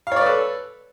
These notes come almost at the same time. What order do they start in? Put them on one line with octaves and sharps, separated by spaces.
F5 C#5 D5 B4 A4